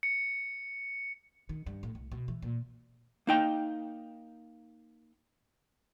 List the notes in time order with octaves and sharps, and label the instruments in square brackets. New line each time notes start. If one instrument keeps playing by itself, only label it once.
[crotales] C#7
[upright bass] D#3
G2
A2
C2
B2
E3
A#2
[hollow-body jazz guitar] A#3 D#4 G5